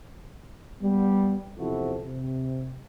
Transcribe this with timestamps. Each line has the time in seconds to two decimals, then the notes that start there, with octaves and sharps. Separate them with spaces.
0.82 G3 B3
1.57 E2 C3 F3 E4 F#4 A4
2.04 C3